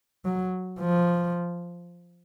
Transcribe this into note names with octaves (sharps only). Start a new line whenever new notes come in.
F#3
F3